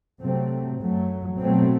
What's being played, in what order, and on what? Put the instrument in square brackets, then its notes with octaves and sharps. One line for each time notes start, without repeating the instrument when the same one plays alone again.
[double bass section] C3 F#3 A3 C4
F#2 F#3 A3
B2 F#3 A3 C4